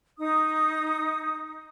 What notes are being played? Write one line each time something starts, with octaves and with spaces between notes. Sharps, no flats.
D#4 D#6